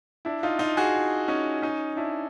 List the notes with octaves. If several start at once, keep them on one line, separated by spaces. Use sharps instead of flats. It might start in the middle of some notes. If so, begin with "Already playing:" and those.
D4 E4
D#4 F4
D#4 F4
F#4 G#4
C#4 D#4
C#4 D#4
D4 E4